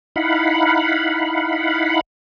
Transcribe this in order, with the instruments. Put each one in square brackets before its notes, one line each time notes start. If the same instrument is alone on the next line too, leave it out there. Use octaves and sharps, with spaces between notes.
[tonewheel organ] D#4 E4 F5 F#5 B5